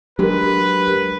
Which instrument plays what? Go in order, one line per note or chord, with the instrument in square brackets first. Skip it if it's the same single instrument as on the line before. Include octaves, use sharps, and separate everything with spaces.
[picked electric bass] F#3 G#3 D4 [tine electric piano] G4 A#4 [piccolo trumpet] B4